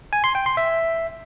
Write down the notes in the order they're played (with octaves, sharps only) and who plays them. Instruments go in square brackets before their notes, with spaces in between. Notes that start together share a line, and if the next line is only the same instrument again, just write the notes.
[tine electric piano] G#5
C6
G5
C6
E5